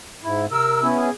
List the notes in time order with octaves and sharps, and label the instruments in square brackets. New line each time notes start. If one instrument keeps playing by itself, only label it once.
[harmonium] G#2 E4
[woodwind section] C3 E6 [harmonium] A#4
[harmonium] B3 C#4 E4
[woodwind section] G#4